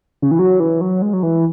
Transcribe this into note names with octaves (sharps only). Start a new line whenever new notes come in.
C#3
E3
F#3
E3
F#3
G#3
F#3
E3